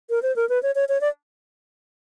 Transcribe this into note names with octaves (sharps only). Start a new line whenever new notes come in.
A#4
C5
A#4
B4
C#5
C#5
C#5
D5